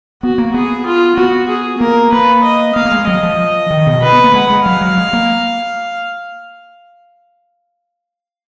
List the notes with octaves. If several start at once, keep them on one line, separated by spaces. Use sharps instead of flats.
B3 F#4
A#3
B3 G#4
F4
B3 F#4
G#4
A#3 A#4
A#3 B4
D#5
A#3 F5
A#3
G#3
F#3 D#5
F3
D#3
B2
D3 B4
B3
A#3
G#3 F#5
G#3
F#3 F5
F#3
G#3
A#3